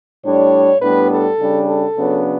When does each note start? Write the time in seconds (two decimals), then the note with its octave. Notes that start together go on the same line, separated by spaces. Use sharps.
0.24 A2 G3 D4 C#5
0.82 A2 G3 B3 D4 B4
1.11 A4
1.39 C#3 G3 D4
1.68 A4
1.96 C#3 F#3 B3 D4